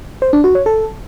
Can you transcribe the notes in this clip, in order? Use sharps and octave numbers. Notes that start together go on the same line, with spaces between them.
C5
D4
F#4
C#5
A4